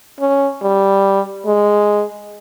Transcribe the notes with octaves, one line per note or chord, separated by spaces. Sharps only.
C#4
G3
G#3